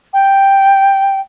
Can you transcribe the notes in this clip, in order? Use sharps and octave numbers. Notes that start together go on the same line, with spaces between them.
G5